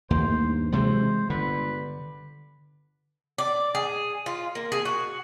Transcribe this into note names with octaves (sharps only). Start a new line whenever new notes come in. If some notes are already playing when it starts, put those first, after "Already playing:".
D#2 A3 A#3 C5
G2
C3 E3 F#3 G#3 C5
G1 D3 B4
D5
G#4
F4
A#3
G#4
F#4